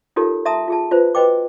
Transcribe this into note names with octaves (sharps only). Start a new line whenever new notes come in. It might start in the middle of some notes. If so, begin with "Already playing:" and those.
D#4 F4 G4 A4 A#4 C#5
E5 A5 A#5 C6 D#6
F4 G#4 A5
F4 B4 C5
F#4 B4 C5 D#5 G5 D6